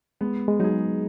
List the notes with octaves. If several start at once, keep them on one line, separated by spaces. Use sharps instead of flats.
G#3 B3
G#3
F#3 D#4 G#4